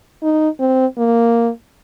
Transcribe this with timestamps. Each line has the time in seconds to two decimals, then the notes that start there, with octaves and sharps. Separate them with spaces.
0.23 D#4
0.60 C4
0.97 A#3